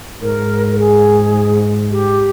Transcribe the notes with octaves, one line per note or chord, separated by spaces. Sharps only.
G#2 A#4
A#4
G#4
G4